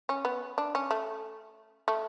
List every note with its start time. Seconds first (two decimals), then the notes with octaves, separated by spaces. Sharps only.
0.09 C#4
0.25 B3
0.58 D4
0.75 C#4
0.91 A3
1.88 A3